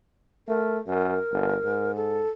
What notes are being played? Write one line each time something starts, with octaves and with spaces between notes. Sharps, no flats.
A3 A#4
F#2 A#4
G1
G#2
A4